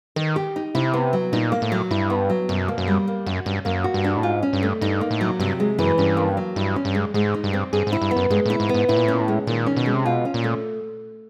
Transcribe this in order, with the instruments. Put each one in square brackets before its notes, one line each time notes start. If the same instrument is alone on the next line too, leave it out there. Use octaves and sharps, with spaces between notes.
[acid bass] D#3 [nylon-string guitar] A#4
[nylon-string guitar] G4
D#4
[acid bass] C3 [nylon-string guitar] E4
[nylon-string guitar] B3
F#3
[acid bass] A#2 [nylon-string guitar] D#4
[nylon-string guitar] A#3
[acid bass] A2
[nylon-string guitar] F#3
[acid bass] G2 [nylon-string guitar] E4
[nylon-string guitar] B3
F#3
[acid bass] F#2 [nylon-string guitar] B2
[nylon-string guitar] A#3
[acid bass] F#2
[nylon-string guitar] G3
A#3
[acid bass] F#2 [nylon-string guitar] F#4
[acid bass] G2 [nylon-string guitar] C#4
[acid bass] F#2 [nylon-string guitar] A#3
[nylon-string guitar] F#4
[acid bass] G2
[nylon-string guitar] D4
[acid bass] A2
[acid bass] G#2 [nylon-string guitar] F4
[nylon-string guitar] C#4
[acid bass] G2
[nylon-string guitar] A3
[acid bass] G2 [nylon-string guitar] D#4
[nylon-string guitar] A#3
[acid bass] A2
[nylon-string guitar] F#3
[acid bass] G2 [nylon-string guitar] C3
[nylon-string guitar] G#3
[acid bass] F#2 [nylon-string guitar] E3
[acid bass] G2 [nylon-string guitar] C#4
[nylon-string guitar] A#3
F#3
[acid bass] G2 [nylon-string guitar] E4
[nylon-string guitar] C#4
[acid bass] G2
[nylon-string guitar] G#3
[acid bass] G#2 [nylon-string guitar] G#3
[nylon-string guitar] D#4
[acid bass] G2
[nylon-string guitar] C4
[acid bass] G2 [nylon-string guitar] G#4
[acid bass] G#2
[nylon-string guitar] E4
[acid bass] G2
[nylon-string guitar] B3
[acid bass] F#2
[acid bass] G2 [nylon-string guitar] G#3
[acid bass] A2 [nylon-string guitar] E4
[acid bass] G#2
[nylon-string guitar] B3
[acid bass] G#2
[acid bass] A2 [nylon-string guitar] E4
[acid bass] A#2
A2
[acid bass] A#2 [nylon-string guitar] C#4
[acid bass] A2
[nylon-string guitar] G#3
[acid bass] A#2 [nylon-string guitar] D#3
[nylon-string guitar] C#4
[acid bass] B2
[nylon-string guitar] G#3
[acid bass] C3
[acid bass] B2 [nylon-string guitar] F4
[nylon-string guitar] C#4
[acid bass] A#2
[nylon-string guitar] A3